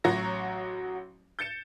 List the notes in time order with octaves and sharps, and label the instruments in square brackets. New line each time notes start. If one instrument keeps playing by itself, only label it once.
[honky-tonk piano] A1 F#3 F#4 C#5 A#5 A#6
G6 A6 C#7 E7